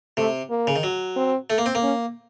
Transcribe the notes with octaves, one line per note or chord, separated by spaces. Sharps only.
C3 A3
A#3
C#3
D#3
F#3
C4
A3
A#3
C4
A#3
C#4